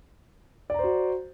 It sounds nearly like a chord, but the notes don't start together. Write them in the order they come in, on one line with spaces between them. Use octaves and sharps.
D5 A#5 C5 F#4